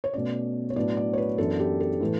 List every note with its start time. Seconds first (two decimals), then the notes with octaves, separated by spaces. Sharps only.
0.04 C#5
0.13 B2 A3 C#4 D5
0.70 C#5
0.76 A2 F#3 B3 D4 D5
0.97 D5
1.13 C#5
1.18 B4
1.38 F#2 E3 B3 D4 A4
1.60 G4
1.80 A4
2.01 A2 E3 A3